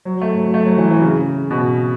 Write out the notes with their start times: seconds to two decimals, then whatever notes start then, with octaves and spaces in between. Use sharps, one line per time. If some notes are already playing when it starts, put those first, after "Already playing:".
0.05 F#3
0.21 A3
0.37 F#3
0.54 A3
0.66 F#3
0.78 E3
0.86 F#3
0.90 E3
1.02 C#3
1.51 B2